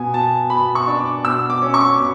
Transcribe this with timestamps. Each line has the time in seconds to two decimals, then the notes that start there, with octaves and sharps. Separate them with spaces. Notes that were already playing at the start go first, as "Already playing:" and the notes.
Already playing: B2 G#5
0.14 B2 A5
0.50 B2 B5
0.75 C#6
0.87 D4
1.00 D6
1.25 B2 E6
1.50 D6
1.62 C#4
1.74 C#6
1.99 B2